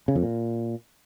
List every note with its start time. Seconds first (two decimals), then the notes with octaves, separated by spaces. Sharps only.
0.08 C#3
0.15 F2
0.23 A#2